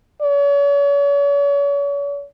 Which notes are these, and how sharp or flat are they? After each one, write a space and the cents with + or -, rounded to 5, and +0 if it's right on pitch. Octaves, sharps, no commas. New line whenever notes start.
C#5 +40